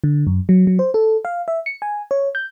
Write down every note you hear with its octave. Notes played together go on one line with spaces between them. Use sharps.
D3
F#2
F#3
F#3
C5
A4
F5
E5
C#7
G#5
C#5
G6